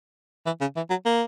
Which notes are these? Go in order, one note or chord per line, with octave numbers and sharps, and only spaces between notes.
E3
C#3
E3
F#3
A#3